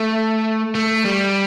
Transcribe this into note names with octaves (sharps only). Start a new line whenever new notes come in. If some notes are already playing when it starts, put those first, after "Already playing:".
Already playing: A3
A3
G3